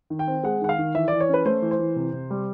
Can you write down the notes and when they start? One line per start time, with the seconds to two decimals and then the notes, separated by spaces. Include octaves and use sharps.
0.10 D#3
0.19 G5
0.28 C4
0.44 G#3 F#5
0.61 D#3 F#5
0.69 F5
0.79 D#3
0.94 E3 E5
1.08 E3 D5
1.20 C#5
1.29 C#4 B4
1.46 A3 C5
1.62 E3
1.71 C5
1.79 E3
1.96 C3
2.13 C3
2.31 G3